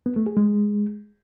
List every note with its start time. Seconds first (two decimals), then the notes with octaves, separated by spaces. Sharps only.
0.06 B3
0.16 A3
0.26 G#4
0.37 G#3